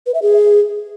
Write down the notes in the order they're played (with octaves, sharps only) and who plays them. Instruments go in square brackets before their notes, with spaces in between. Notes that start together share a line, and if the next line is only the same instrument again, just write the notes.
[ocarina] B4
E5
G#4